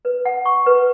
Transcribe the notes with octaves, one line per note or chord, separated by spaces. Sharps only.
B4
F#5
C#6
B4